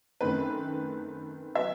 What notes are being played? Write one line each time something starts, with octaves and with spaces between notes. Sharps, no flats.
F#2 D#3 A3 C4 B4
F#3 B3 E5